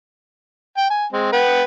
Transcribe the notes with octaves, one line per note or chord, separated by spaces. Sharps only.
G5
G#5
G#3 C4
B4 F#5 G5